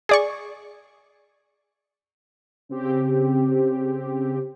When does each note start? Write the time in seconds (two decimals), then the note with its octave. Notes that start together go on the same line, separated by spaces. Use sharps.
0.09 G#4 D5 C#6
2.69 C#3 C4 G4